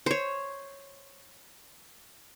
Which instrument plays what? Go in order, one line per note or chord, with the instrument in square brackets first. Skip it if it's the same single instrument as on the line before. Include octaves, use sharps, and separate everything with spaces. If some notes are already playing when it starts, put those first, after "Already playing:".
[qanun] C5 C#5